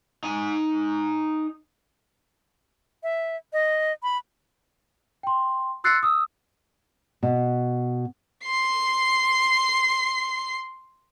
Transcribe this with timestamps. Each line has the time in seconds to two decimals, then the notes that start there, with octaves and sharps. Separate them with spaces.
0.23 D#4 G#5
3.03 E5
3.53 D#5
4.03 B5
5.23 G5 C6
5.84 C6 E6 F#6 A6 C7 C#7
6.03 D#6 E6
7.23 B2
8.45 C6 C7